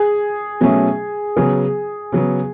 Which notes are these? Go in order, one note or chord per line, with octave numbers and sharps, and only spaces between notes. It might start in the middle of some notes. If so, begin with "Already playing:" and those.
Already playing: G#4
B2 F#3 A3 C#4
C#3 F#3 B3 G#4
C#3 F#3 B3